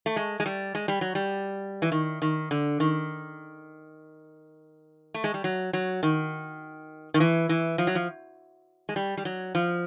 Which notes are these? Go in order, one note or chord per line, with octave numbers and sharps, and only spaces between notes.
A3
G#3
G#3
G3
G#3
G3
F#3
G3
E3
D#3
D#3
D3
D#3
A3
G#3
G3
F#3
F#3
D#3
D#3
E3
E3
F3
F#3
F3
G#3
G3
G3
F#3
F3